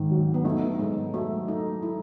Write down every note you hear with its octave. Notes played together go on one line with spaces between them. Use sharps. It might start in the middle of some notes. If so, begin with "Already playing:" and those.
Already playing: G#2 D#3
F#3
B3
A3 D#4
G#2 G#3
F#3 A3
A3 D#4
E4